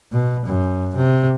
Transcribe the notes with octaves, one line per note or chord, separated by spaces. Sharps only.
B2
F#2
C3